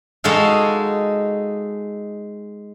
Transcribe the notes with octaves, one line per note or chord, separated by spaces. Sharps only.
G#3 D#4 F#4 A4 F5